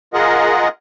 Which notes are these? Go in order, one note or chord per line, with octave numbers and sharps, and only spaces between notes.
F4 G#4 A#4 D#5 F#5